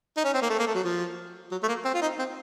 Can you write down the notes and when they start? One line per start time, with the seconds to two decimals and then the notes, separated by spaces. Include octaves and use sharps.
0.17 D#4
0.24 C#4
0.34 C4
0.42 A#3
0.50 A3
0.59 A#3
0.67 A3
0.75 F#3
0.84 F3
1.52 F#3
1.63 A3
1.68 A#3
1.85 C4
1.94 F4
2.02 D#4
2.19 C4